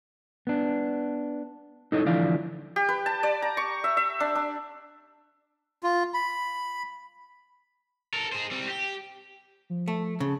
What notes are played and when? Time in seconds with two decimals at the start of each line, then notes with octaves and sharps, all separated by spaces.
0.47 B3 D4
1.92 D#4 E4 A4 C#5 D#5
2.05 D3 E3 F3 E4 D5 F5
2.76 G4
2.89 B4
3.06 A5
3.23 D5
3.42 A#5
3.57 C#6
3.84 E5
3.97 E5
4.20 D4
4.35 D4
5.83 F4
6.14 B5
8.13 A4 A#4
8.32 G#4 C5
8.51 G3 C4
8.68 G4
9.70 F3
9.88 A3
10.20 C#3 A5